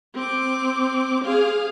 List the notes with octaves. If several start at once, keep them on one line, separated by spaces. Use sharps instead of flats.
C4 D6
G#4 F5